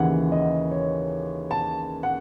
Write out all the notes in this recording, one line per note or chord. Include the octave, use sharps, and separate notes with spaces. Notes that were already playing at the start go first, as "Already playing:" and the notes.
Already playing: D#2 C#3 E3 F#5
D#5
C#5
A5
F#5